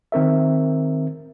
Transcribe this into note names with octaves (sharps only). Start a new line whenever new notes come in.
D#3 C4 A#4 E5